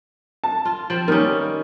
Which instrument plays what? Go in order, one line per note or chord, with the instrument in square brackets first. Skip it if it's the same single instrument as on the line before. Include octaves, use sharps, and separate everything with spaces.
[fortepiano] A5
[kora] F4
F3 C4
[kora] D#3 G3 C#4 [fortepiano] A#3